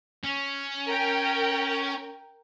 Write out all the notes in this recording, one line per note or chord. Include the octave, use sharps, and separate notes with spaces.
C#4
A#4 G5